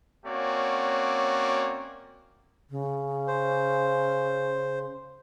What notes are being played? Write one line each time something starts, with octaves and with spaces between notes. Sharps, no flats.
A#3 C4 C#4 F#4 C#5 D5
C#3
C5